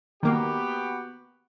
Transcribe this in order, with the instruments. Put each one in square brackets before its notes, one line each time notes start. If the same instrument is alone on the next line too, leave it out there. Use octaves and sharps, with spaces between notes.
[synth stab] D#3 A#3 [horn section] B3 F#4 G4